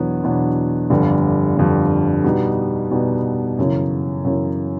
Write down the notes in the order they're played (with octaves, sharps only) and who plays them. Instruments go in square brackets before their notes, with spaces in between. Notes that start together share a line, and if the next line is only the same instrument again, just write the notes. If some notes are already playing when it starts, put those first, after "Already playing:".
Already playing: [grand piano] E2 B2 F#3 B3 D4
E2 B2 F#3 B3 D4
G1 F2 D3 G3
G1 F2 D3 G3
B2 G3 B3 D#4
B2 G3 B3 D#4
F#2 C#3 E3
F#2 C#3 E3